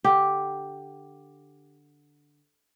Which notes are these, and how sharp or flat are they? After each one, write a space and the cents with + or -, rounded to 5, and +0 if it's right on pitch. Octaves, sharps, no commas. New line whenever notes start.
D3 +0 G4 +0